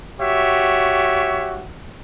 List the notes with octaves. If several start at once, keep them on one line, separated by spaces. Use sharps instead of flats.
F#4 G4 C#5 E5